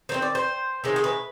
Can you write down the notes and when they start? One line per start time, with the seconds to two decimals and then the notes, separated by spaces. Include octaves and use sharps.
0.09 D#3 G#3 C4 C5
0.22 D5
0.35 C5
0.84 C3 D#3 G#3 C5
0.96 G#4
1.04 B4